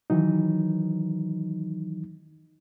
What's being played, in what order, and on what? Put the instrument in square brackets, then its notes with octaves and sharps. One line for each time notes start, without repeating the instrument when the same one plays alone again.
[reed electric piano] D#3 E3 F#3 D#4